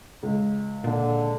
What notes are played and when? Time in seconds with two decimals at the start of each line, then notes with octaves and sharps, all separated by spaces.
0.23 C#2
0.84 A#2 D3